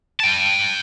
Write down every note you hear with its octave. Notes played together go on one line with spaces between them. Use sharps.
G5 A5